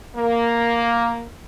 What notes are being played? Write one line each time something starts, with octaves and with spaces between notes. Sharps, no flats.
A#3